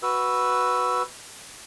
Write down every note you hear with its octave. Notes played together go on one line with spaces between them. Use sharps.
F#4 B4 E6